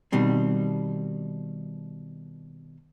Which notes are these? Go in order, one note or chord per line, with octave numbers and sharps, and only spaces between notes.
B2 D#3 G3 C4